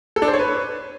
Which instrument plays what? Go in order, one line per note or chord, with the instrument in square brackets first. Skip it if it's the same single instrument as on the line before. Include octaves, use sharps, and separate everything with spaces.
[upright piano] A4
D4
C5
C#5
B4